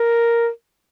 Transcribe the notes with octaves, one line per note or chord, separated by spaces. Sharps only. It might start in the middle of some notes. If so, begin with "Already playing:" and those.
Already playing: A#4